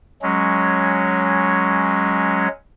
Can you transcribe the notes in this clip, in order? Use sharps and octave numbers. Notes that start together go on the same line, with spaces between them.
F#3 G#3 C#4